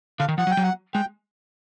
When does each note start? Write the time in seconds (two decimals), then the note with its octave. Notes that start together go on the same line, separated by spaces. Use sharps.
0.20 D3 F5
0.28 D#3
0.38 F3 F#5
0.47 F#3
0.51 G5
0.57 F#3
0.63 F#5
0.94 G#3 G5